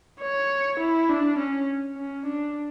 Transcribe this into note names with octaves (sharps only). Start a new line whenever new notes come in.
C#5
E4
D4
C#4
C#4
D4